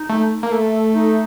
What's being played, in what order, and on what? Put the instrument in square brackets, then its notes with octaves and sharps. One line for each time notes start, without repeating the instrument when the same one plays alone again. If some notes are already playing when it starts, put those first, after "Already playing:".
Already playing: [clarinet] D#4
[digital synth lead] A3
A#3
A3
[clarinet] D#4